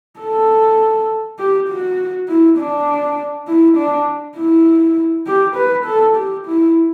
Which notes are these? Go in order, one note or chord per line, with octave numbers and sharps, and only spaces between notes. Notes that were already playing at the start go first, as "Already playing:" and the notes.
A4
G4
F#4
E4
D4
E4
D4
E4
G4
B4
A4
G4
E4